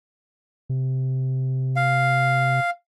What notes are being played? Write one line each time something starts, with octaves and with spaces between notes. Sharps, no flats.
C3
F5